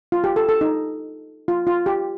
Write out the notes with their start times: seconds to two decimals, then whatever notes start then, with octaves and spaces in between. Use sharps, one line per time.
0.12 F4
0.24 G4
0.36 A4
0.49 A4
0.61 D#4
1.48 F4
1.67 F4
1.86 G4